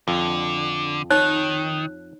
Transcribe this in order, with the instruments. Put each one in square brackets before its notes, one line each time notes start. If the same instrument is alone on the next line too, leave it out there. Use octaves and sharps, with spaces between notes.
[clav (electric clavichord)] F2 [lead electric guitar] D3
[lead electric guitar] D#3 [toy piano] D#4 C#5 [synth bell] F#6